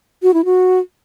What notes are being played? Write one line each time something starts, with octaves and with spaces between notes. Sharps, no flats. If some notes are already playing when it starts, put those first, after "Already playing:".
F#4
E4
F#4